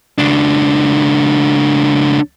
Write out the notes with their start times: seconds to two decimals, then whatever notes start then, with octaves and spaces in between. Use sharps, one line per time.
0.18 C#2 D4